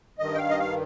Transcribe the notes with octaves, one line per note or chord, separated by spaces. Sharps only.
G2 D#3 D#5
G5
F5
D#5
F5